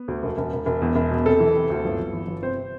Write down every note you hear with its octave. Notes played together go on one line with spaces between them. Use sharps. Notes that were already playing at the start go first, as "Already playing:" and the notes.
Already playing: B3
D2
E1
E1
E1
E1
E2
E1
B2
C3 A4
E3
C3
D2
G1
G1
E3
G1
C3 C5